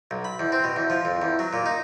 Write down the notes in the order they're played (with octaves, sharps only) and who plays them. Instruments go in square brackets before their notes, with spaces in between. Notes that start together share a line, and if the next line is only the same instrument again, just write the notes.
[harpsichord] B1
B5
E2
C4
B2
E2
F3
F2
E2
F#3
A#2
D#4